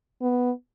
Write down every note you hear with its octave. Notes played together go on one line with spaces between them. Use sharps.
B3